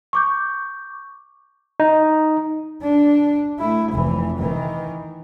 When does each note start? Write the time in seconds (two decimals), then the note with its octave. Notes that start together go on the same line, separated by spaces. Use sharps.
0.13 C#6 D6 G6
1.80 D#4
2.82 D4
3.59 A3 E4
3.93 F1 E3
4.38 D#3 E3